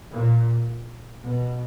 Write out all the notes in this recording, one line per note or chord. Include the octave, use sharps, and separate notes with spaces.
A#2
B2